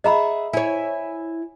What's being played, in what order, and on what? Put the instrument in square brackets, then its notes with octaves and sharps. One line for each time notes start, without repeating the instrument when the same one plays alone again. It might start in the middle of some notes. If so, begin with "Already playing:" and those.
[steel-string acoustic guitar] G#4 E5 F#5 [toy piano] D#5 A#5 B5
[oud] E4 C#5 [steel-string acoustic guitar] G#5